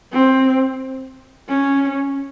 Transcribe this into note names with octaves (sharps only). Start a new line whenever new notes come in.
C4
C#4